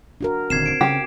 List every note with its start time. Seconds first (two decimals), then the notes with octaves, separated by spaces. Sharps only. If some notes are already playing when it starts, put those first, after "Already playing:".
0.21 D4 F#4 A#4
0.50 D#1 D#2 D3 C4 G#6 C7 E7
0.66 C7 D7
0.81 C#3 G4